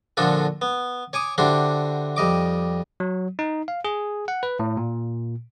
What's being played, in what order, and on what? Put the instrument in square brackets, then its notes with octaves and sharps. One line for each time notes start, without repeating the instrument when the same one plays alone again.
[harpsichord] A#2 D3 F3 D4 F#4 A4
B3
C#5 G#5 D6 D#6
D3 D4 E4 F#4 G4 C5
F2 G3 D#5 D6
[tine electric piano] F#3
D#4
F5
G#4
F#5
B4
A2
A#2